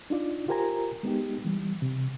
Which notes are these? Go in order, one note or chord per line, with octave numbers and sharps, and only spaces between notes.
D4 D#4 F4 D5
F4 G4 A#4 C5 G#5 A#5
G#3 B3 D#4 G4
E3 G3
C3